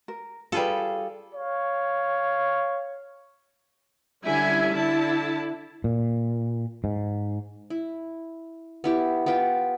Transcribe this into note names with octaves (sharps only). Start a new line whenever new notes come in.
A#4
G3 F4 G#4 A4 B4
C#5 F5
D3 G3 C#4 E4 E5 G#5
D3 E4 A5
A#2
G#2
E4
B3 E4 G4
B3 F4 B4 G5